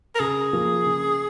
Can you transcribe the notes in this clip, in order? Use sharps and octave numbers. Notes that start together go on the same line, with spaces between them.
A#4
C#3 G#4
F3 A#3
C#3